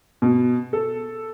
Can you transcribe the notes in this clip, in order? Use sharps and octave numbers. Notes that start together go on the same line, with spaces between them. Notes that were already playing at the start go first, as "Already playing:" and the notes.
B2
A4